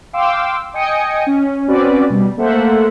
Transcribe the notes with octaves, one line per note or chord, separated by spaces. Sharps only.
F5 G5 C6 D6 E6
D#5 G5 G#5 D#6 C#7
C#4
C4 C#4 F#4 B4 D5
B2 G3
A3 A#3 A4 C5 E5 F#5